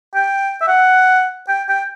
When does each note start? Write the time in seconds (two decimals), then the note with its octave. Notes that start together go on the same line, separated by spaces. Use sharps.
0.15 G5
0.61 E5
0.68 F#5
1.49 G5
1.69 G5